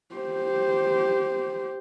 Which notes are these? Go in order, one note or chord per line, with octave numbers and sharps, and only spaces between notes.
G4 C5